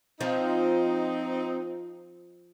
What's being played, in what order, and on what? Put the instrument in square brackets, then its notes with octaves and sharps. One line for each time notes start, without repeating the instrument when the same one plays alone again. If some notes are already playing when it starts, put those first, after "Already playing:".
[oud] F3 [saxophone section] C4 D#4